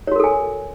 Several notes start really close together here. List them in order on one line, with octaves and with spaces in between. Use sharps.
C#5 F#4 A#4 A4 G#5